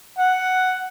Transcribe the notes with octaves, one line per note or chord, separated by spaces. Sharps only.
F#5